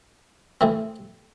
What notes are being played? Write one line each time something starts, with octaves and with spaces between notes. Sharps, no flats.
A2 E3 C4